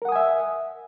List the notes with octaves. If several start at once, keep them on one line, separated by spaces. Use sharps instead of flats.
A#4 E5 F#5 G#5 D#6